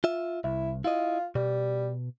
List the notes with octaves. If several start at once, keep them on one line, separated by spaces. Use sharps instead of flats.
F4 E5
C2 E4
E4 F4 D#5
B2 G3